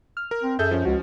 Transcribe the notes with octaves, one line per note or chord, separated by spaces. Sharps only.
F6
A#4
C4
F#2 G#4 A4 E5 G6
F3 C#4
C#2 F#4